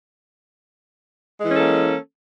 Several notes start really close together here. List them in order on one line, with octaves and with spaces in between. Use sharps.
G#3 E3 C#4 A4 A#3